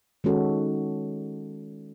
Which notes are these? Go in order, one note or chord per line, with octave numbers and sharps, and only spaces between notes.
D#3 G#3 C#4 F#4 A4